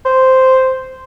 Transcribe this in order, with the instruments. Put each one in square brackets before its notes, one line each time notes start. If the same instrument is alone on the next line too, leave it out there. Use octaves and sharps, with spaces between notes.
[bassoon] C5